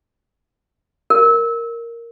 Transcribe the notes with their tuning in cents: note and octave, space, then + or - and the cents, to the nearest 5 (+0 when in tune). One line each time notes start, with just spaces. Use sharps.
A#4 -5